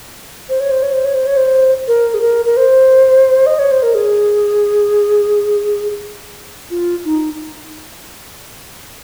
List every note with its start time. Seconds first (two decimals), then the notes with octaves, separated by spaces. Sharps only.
0.49 C5
0.60 C#5
0.71 C5
0.83 C#5
0.93 C5
1.05 C#5
1.15 C5
1.27 C#5
1.37 C5
1.88 A#4
2.14 G#4
2.21 A#4
2.45 A#4
2.57 C5
3.46 D#5
3.59 C#5
3.71 C5
3.83 A#4
3.95 G#4
6.71 F4
7.05 D#4